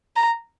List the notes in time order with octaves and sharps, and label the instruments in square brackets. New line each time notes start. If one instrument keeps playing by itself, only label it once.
[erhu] A#5